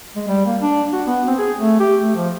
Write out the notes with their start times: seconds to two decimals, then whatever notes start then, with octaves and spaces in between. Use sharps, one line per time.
0.16 G#3
0.28 G3
0.46 A#3
0.62 D4
0.93 F#4
1.07 B3
1.27 C4
1.39 G#4
1.58 A3
1.80 G4
2.03 A3
2.16 F3